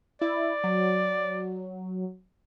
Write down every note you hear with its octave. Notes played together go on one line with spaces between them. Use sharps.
E4 D5
F#3